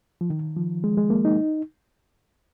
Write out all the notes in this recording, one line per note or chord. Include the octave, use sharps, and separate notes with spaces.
F3
D#3
F3
G#3
G#3
A#3
D#4